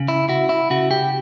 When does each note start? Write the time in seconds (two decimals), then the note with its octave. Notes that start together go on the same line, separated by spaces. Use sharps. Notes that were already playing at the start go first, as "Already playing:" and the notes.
Already playing: C#3
0.08 E4
0.29 E4 F#4
0.49 E4
0.70 C#3 F#4
0.91 G4